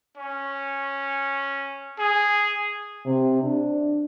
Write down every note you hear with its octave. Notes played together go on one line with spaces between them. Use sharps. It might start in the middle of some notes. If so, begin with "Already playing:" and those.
C#4
G#4
C3
D4